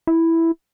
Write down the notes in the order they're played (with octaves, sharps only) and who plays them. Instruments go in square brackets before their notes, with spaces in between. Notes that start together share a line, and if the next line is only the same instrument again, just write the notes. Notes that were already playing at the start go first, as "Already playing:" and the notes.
[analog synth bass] E4